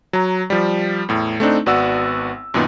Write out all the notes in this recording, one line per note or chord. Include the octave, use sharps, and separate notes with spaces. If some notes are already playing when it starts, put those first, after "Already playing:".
F#3 A#5
F3 G3
E2 A2
A3 C4 D4 D#4
G#1 B3 F#4 D5 F#5 E6
F#2 A#2 D#3 B3 D#4